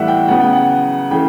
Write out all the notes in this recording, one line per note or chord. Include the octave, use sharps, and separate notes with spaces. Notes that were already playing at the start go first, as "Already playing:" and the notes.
Already playing: A2 E3 G3 B3 E5 F#5
G5
C#3 F#3 B3 F#5
G5
F#5
C#3 E3 A3 G5